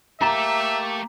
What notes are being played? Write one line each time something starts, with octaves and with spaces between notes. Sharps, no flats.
A3 A#3 G4 E5 A5 A#5